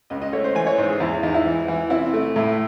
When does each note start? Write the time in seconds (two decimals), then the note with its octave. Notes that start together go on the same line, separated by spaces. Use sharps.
0.10 C#2 D#5
0.22 D#5
0.33 A3 C#5
0.44 C5
0.55 E3 G#5
0.67 C#5
0.78 G#2 C5
0.90 G#4
1.00 E2 E4
1.23 E2 D#4
1.34 E4
1.46 E3
1.68 E3
1.90 C3 E4
2.13 A3
2.36 A2